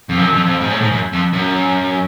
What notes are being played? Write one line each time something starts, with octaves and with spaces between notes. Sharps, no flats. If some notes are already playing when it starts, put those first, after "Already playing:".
F2
F#2
F2
F2
G#2
A2
G#2
F#2
F2
F#2